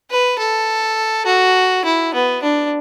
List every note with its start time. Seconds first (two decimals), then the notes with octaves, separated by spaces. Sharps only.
0.10 B4
0.38 A4
1.26 F#4
1.85 E4
2.14 B3
2.42 D4